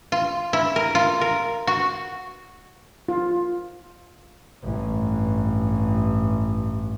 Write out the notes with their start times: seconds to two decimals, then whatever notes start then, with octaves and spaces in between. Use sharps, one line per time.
0.12 F4
0.53 E4
0.76 A#4
0.95 F4
1.21 A#4
1.67 F#4
3.09 F4
4.64 A1 G2